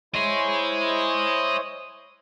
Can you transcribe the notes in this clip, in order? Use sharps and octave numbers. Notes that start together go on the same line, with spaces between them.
E4 C5 C#5 D#5 G#5